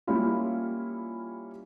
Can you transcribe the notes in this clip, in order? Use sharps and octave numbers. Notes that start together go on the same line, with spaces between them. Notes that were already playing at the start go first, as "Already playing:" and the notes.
G3 A#3 C#4 E4 F4